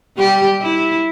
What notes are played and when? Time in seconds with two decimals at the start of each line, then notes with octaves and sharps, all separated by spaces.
0.17 G3 G4
0.61 E4